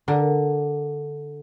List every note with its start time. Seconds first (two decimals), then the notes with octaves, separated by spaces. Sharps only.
0.08 D3 A#4